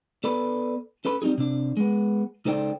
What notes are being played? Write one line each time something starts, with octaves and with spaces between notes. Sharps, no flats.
B3 A4 B4 D5 B5
C#4 A4 B4 B5
G3 C4 D#4 G#4
C3 D4
G#3 B3
C#2 D#4 A4 C5 D5 G5